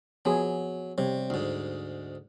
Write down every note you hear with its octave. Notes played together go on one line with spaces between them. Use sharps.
F3 F#3 B3 G#4
C3 G3 C#5
D2 G#2